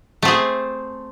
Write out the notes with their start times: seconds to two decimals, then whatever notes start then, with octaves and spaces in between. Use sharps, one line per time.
0.22 A3
0.25 C4
0.28 G#4